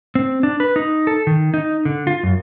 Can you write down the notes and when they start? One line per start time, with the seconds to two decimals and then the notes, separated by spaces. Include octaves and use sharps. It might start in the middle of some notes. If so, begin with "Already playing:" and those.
0.15 C4
0.43 D4
0.60 B4
0.76 D#4
1.07 A4
1.27 D#3
1.54 D#4
1.85 D3
2.07 F4
2.23 F#2